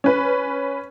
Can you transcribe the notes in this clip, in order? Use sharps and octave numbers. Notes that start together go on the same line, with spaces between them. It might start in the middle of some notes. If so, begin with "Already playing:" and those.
C#4 B4